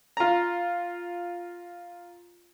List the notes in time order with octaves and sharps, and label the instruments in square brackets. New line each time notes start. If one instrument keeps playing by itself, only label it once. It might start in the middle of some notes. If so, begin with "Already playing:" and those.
[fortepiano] F4 A#5